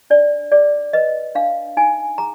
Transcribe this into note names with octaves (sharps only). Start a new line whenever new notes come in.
D4 D5
G#4 D5
B4 D#5
D4 F5
D#4 G#5
G#4 A#5